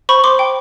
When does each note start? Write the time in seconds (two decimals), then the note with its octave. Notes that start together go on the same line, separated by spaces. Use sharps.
0.09 C5 B5 C#6
0.24 C5 C6 D6
0.39 G5